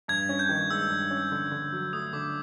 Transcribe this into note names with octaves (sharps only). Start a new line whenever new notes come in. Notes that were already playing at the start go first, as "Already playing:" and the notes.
G2 G#6
C#4
G6
D#3
G#3 E6
G2
C#4
D3
D3
F#3
A3 D#6
D3 D6